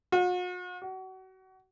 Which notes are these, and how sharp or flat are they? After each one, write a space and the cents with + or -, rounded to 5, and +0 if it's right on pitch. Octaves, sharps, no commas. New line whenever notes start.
F#4 -45
F#4 +30